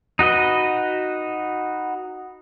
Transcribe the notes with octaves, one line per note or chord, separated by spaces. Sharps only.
D#4 F#4 B4 D#5